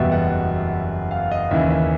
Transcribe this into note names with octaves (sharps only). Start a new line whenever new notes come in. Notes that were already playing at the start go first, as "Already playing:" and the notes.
Already playing: F#1 E2 B2 G3 B3 E5
F#5
F5
D#5
D#2 C#3 E3 E5
E5